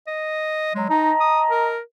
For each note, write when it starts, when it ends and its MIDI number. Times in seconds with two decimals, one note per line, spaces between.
0.07 0.74 75
0.75 0.88 54
0.75 0.89 56
0.90 1.13 63
0.90 1.72 75
0.90 1.72 81
0.90 1.72 82
1.20 1.42 87
1.50 1.80 70